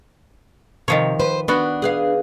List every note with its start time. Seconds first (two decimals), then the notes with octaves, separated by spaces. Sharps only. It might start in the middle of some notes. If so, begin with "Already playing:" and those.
0.88 C3 D#3 F3 C#5
1.20 B4 C5
1.48 B3 D4 F#4
1.82 G#4 B4 F5